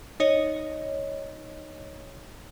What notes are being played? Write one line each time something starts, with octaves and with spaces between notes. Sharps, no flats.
D#4 C#5 D#5